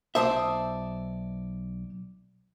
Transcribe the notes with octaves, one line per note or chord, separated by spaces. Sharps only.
B1 C5 D5 E5 A5 D#6